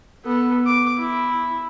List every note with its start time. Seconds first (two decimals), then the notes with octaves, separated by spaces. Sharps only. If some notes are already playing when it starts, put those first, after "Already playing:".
0.25 B3 A4
0.67 D6
0.98 E4